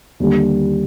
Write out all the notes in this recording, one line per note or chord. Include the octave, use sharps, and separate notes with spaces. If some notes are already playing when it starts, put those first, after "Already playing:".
D#2 D3 G3